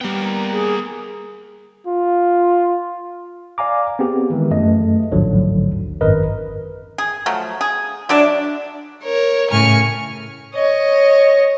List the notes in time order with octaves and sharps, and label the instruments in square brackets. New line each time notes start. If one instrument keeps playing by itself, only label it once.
[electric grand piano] G3 B3 [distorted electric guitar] A#3 G5
[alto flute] A#5
G#4
[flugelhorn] F4
[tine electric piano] D5 F5 G#5 A#5 D6
B3 C4 G4 G#4
D#3 E3 G#3
F#2 A3 D#5
A1 D#2 G#2 D3 F3 F#3
G#1 F#2 A#4 B4 D#5
[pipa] G#4
F3 F#3 A3
G#4
[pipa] F#3 D5 E5 [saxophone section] D4
[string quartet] A#4 C#5
A2 C#3 G#5 C#6 F6
[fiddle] C#5 D#5